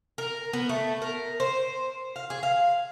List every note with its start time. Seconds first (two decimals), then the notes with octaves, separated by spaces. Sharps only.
0.18 A#4
0.53 B3
0.69 A3
1.02 A#4
1.40 C5
2.16 F5
2.30 G#4
2.43 F5